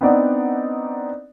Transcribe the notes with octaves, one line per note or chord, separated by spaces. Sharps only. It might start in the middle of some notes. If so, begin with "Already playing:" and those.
B3 C4 D4 D#4 D5 F#5